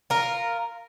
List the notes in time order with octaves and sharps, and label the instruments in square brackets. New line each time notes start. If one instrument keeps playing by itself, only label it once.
[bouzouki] F4 A#4